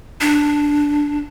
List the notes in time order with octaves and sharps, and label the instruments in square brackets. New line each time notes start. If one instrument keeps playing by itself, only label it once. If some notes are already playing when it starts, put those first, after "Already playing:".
[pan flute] D4